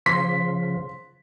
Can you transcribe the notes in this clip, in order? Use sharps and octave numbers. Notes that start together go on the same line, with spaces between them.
C#3 F3 C6 B6